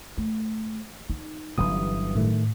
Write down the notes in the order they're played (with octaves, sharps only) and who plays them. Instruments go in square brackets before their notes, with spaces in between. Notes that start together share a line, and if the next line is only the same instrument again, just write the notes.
[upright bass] A3
D#4
[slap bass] G1 G2 E3 [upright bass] F#3 C#4 [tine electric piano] D#6
[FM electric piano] A2 [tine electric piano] D#3 A3